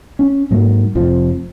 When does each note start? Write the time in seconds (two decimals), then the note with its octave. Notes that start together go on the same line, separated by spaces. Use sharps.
0.19 C#4
0.51 G#2 F#3 A#3
0.95 F1 F2 F3